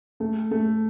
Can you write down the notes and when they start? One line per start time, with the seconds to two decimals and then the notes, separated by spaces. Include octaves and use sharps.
0.20 A3
0.51 A3